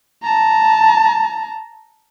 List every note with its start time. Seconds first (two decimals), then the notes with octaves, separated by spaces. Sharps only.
0.23 A5 A#5